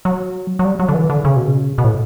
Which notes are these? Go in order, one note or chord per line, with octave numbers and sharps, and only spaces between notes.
F#3
F#3
G3
F#3
D3
E3
D3
C#3
B2
C#3
B2
A2